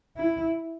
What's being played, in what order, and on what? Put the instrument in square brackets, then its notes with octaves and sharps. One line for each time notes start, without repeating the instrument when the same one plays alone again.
[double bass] E4